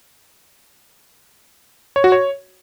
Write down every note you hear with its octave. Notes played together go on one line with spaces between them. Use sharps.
C#5
F#4
C#5